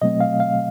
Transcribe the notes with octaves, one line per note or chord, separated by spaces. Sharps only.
B2 F#3 A3 C4 D#5
F5
F5